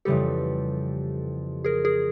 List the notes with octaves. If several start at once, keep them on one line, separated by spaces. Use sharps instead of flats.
F2 C#3 E3 G3 B3 G4 A4
G#4 A#4
G#4 A#4